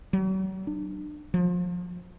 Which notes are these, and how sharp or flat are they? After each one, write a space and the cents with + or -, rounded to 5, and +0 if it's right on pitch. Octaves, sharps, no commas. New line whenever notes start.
F#3 +40
D4 +35
F3 +30